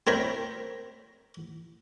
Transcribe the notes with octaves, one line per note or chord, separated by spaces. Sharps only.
C4 A#4 C5 C#5 A#5 B5